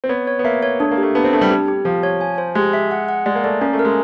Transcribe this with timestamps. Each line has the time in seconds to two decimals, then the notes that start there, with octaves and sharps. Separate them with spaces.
0.04 C4
0.09 B3 C#5
0.27 C#5
0.39 B3
0.44 A#3 E5
0.63 C#5
0.80 A3 D4
0.91 A#3
0.98 G4
1.03 A3
1.15 B3 D4
1.24 C4
1.33 A3 D4
1.41 G3
1.51 G4
1.68 G4
1.85 F3 G4
2.03 C#5
2.21 G#5
2.38 C5
2.55 G#3 G4
2.73 E5
2.91 F#5
3.08 F#5
3.26 G#3 D5
3.35 A#3
3.44 A3 D5
3.61 A#3 C#4
3.73 A3
3.79 A#4
3.85 G#3